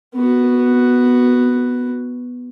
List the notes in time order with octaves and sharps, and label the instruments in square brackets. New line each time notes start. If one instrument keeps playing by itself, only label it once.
[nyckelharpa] B3 F#4